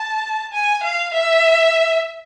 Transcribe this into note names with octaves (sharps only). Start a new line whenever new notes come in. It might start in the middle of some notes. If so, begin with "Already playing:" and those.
Already playing: A5
G#5
F5
E5